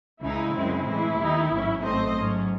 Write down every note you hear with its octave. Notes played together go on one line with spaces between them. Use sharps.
C#2 C#3 G#3 D#4 E4
F#2 C#3 G#3 C4
A2 E3 G#3 E4
D#2 D#3 A3 D#4
A1 G#2 F#3 C#4
A1 G#2 F#3 A3 C4 C5 D#5
G#2 F#3 C#4